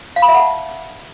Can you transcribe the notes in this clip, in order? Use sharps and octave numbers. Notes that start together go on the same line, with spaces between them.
F5
B5
E5
F#5
A5